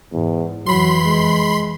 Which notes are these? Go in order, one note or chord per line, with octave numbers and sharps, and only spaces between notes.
E2 G#2
F2 E3 F#3 B5 C6
G#3